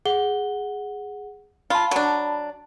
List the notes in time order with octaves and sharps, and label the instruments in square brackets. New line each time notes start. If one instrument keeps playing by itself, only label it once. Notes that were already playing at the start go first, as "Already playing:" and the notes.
[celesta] G#4 F#5 G7
[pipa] F4 [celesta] A5 B5
[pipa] F#3 D4